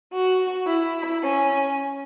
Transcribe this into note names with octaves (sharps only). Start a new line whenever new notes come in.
F#4
E4
C#4